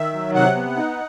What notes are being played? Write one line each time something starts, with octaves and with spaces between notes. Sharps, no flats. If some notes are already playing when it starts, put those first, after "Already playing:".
Already playing: D#3 E5
F#3
C3 F#5
B3
D#4